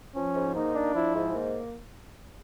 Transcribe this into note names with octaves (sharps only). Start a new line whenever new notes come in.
F3 C#4
G#2
A#3 D#4
D4
F3 E4
G#2
A#3